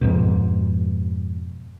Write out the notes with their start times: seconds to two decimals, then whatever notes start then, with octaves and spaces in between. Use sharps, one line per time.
0.01 F2 G#2 B2